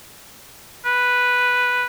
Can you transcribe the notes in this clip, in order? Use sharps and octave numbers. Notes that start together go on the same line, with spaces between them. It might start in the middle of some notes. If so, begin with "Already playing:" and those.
B4